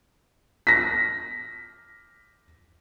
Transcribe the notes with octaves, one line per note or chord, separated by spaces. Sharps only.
A#6 B6